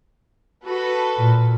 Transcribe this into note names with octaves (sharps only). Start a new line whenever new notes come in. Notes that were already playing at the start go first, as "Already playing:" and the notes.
F#4 A4 B4
A#2